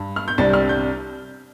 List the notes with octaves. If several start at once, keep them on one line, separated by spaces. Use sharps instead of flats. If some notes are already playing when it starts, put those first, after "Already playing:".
Already playing: G2
F6
G6
C2 C3 G3 D4 A6
F6
G6